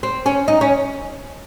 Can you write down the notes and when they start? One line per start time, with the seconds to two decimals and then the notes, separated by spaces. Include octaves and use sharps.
0.03 C4
0.26 C#4
0.48 D#4
0.61 C#4